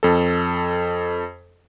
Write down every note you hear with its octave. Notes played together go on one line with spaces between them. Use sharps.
F2 A4